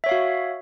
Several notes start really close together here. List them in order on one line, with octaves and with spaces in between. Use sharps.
E5 C#5 F5 F#4